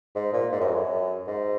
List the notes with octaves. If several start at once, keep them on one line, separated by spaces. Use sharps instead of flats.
G#2
A#2
G#2
F#2
F2
F#2
G#2